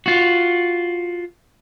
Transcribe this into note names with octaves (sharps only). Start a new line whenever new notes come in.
F4 F#4